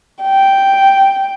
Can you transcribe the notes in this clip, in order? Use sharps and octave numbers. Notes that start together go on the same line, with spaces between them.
G5